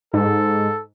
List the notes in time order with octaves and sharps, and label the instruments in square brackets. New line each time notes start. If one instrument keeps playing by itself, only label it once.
[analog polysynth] G#2 [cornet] A4